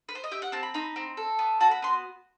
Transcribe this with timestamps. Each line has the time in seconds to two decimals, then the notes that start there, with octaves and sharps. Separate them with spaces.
0.09 B4
0.15 C5
0.24 D#5
0.31 G4 E5
0.42 F#5
0.52 C4 A5
0.63 B5
0.74 D#4 B5
0.96 C4
1.17 A4
1.39 B3
1.60 F#4 A5
1.71 B5
1.82 B3 C6